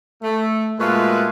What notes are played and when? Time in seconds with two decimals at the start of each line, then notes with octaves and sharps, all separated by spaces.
0.23 A3
0.79 A#2 G#3 A3 F4 F#4 B4